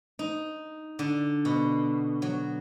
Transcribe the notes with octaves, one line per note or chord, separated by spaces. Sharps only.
D#4
D3
B2
F#3